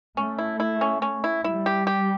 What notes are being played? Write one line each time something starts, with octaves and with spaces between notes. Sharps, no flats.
A3 C#4
E4
E4
C#4
C#4
E4
G3 E4
G4
G4